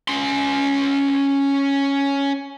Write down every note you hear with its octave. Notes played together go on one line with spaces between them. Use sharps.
C#4 C6